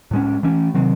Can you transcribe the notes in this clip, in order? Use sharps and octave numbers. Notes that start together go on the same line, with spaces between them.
A2 G#3 C#4
E3 A3 C#4
C3 D#3 F#3 C4